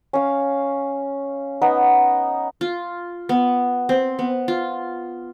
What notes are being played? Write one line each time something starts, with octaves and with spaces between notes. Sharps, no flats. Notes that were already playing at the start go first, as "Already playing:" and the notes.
C#4 F5
B3 D#4
F4
B3
C4
B3
F4